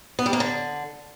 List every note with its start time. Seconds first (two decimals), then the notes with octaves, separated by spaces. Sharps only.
0.19 B3
0.26 G3
0.33 A#3
0.40 D3